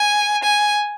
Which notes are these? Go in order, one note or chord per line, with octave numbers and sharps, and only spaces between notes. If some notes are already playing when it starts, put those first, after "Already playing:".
Already playing: G#5
G#5